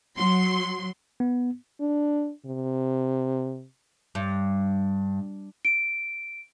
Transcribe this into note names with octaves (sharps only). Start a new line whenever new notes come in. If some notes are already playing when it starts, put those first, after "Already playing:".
F#3 C6
B3
D4
C3
G2
D7